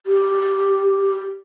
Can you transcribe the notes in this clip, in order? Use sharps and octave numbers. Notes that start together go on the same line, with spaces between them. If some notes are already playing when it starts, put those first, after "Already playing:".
G4